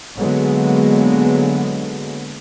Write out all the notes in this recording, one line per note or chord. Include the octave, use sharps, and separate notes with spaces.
D3 F#3 G#3 A#3 B3